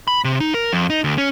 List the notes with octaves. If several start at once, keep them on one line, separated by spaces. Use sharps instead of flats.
B5
C3
D#4
A#4
F2
D#4
D2
C#4